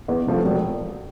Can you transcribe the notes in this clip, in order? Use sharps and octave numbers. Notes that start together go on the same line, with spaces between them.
E2
C3 F3 A3
E1